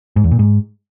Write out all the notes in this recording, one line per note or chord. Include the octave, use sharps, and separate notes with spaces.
G#2
E2
A#2
G#2